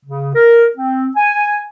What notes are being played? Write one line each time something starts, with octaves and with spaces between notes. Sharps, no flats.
C#3
A#4
C4
G#5